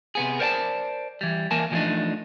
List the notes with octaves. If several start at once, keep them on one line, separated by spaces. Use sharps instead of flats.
C3 B3 G#4
A#4 C5 D5 G5 A5
E3 G3
E3 A#3 A#4 G#5 A5
E3 F3 G3 A3 D4 D#4